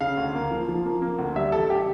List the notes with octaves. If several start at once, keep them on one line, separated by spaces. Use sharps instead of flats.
C#3 F5
D2
A#3
F3
F3
A#3
A#3
D2
G3 E5
A1 A4
G4